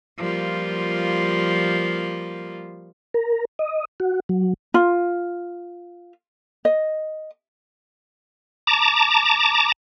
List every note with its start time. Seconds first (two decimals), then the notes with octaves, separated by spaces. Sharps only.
0.18 F3 G3 A#3 F4
3.14 A#4
3.59 D#5
4.00 F#4
4.29 F#3
4.74 F4
6.65 D#5
8.67 A5 A#5 D6